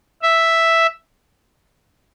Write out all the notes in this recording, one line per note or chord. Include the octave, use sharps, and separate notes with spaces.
E5